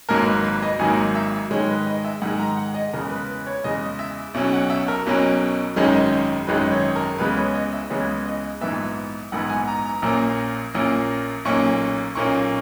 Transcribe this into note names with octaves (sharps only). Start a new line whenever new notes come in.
G#1 G#2 F#3 A#3 A#4
B4
B4
D#5
G#1 G#2 F#3 A#3 G#5
E5
G#2 D#3 G#3 C#5
B4
D#5
E5
G#2 D#3 G#3 F#5
A#5
F#5
D#5
E2 C#3 G#3 A#4
B4
B4
C#5
E2 C#3 G#3 D#5
E5
B1 B2 F#3 C#4 E5
F#5
E5
A#4
B1 B2 F#3 C#4
G#1 F#2 D#3 G#3 C#4
G#1 F#2 D#3 G#3 C#4 B4
C#5
A#4
C#2 C#3 E3 G#3 B3 B4
C#5
D#5
E5
C#2 C#3 E3 G#3 B3 C#5
D#5
A#1 G#2 E3 B3 E5
A#1 G#2 E3 B3 F#5
G#5
A#5
A#5
A#1 A#2 A#3 C#4 A#5
A#1 A#2 A#3 C#4
B1 A#2 A#3 C#4 C#6
B1 A#2 A#3 C#4 C#6